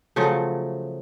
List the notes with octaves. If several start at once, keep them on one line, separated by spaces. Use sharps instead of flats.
C#3 F3 F#3 A3